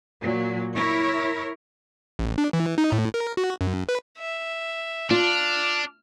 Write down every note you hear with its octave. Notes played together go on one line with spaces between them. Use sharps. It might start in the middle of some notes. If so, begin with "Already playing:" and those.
A#2 F#3
E4 A#4 C#5
A1
D4
E3
D#4
A2
A#4
F#4
F#2
B4
E5
D4 F4 F6